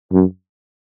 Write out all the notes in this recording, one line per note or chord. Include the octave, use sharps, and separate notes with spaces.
F#2